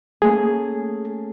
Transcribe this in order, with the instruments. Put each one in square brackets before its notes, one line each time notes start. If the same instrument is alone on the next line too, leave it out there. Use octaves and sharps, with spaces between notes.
[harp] A3 A#3 C#4 [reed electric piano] G#4